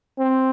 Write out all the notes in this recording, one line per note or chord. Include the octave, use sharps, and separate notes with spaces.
C4